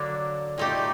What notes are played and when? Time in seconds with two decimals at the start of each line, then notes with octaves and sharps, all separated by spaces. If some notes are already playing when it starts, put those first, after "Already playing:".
Already playing: D3 F#3 A#3 D4
0.58 A#2 A3 D#4 G4